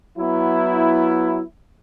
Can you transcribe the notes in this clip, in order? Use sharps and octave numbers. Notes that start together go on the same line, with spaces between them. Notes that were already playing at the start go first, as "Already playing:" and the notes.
F#3 B3 E4